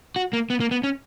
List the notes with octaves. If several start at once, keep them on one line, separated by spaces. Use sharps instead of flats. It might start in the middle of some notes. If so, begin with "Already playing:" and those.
F#4
A#3
B3
A#3
B3
C#4